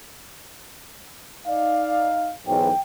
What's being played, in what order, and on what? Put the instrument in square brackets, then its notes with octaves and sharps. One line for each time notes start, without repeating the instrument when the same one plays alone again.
[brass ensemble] D#4 F5 [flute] D5
[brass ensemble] B1 E2 G#2 [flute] G5